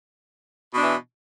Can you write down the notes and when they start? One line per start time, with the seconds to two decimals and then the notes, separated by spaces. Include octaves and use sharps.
0.74 B2
0.78 D4
0.81 E3